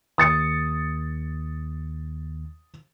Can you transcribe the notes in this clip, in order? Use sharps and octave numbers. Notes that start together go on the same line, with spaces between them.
D#2 D#6 A6 C#7